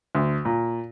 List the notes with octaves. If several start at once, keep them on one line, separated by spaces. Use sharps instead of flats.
D2
A#2